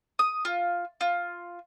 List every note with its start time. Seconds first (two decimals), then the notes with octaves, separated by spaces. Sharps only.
0.19 D#6
0.45 F4
1.01 F4